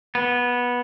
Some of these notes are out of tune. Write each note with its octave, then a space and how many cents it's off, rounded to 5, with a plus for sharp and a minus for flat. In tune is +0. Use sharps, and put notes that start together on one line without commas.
B3 -15